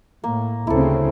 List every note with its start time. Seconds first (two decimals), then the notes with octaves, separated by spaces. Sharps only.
0.24 A2 A#3
0.67 D2 C#3 C4 E4 A4